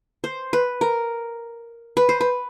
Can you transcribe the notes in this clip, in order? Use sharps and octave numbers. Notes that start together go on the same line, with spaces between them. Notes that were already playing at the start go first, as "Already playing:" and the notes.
C5
B4
A#4
B4
C5
B4